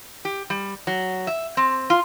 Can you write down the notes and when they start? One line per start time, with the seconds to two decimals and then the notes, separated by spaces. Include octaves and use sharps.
0.25 G4
0.50 G3
0.87 F#3
1.27 E5
1.57 C4
1.90 F4